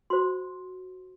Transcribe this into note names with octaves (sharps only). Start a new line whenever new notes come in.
F#4 C5 C6